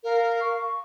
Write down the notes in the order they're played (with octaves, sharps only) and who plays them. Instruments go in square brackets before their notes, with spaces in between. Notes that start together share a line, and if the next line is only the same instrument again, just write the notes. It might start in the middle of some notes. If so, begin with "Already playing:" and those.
[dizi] A#4 [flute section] F5
[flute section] C#6